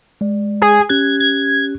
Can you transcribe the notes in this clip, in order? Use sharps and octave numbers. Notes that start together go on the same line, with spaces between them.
G#3 D5
G#4
C#4 G4 F#6 G#6
G#6